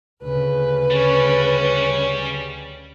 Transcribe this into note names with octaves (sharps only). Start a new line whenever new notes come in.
D2 C#3 B4
G3 C#4